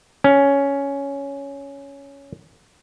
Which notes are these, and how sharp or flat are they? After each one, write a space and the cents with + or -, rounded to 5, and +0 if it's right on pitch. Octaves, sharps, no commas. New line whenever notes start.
C#4 +10